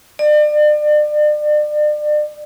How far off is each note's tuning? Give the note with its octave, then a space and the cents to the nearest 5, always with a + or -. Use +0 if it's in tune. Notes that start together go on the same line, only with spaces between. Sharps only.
D5 +35